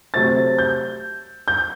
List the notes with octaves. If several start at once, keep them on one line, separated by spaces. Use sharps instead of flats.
C3 F#3 A3 C4 A6
G6
G6